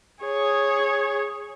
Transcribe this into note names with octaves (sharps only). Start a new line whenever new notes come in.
G#4 C#5